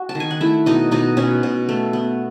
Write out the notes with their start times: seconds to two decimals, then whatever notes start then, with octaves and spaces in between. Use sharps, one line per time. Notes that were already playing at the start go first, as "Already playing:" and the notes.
Already playing: F#4
0.09 A5
0.15 D#3
0.20 G#5
0.31 F#5
0.41 A3 E4 E5
0.66 B2 D#4 D#5
0.91 B2 D#4 D#5
1.17 B2 C#4 C#5
1.43 B2
1.69 A3
1.93 B3